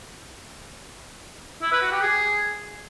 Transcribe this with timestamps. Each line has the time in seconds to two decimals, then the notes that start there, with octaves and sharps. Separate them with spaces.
1.62 E4
1.72 B4
1.82 F#4
1.91 G4
2.01 G#4